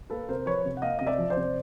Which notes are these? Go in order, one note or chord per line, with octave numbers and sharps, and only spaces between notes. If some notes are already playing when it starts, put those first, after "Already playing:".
A#3 A4 B4
C3 A#4 C5
F3 B4 C#5
C3
F#5
A#3 D#5 F5
C3 D#5
D5 E5
F3
C5 D5
C3